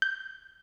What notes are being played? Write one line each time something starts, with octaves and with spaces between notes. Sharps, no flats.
G6